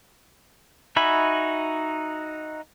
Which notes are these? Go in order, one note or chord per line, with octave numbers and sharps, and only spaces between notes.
D#4 F#4 E5 G#5 B5